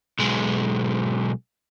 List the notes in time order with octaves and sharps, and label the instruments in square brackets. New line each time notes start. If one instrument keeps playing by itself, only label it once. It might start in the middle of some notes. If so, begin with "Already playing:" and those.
[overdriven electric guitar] B1 G#3